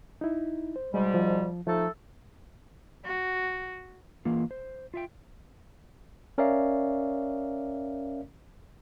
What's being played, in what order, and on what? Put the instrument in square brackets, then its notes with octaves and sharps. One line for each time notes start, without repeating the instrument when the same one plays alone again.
[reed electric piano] D#4 E4
C5
[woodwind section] G#2 B2 G3 [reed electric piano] G#3
[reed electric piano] F3
[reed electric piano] F3 [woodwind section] A3 D#4 A4
[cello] F#4
[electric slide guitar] E3 A#3 F4
C5
F4 E5 G5
[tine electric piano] C#4 A#4 C#5 D5 E5 F5